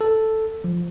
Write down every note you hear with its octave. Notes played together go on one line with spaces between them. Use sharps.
A4
F3